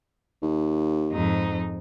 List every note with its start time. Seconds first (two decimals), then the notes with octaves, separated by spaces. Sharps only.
0.42 D#2
1.11 F2 G#2 D#4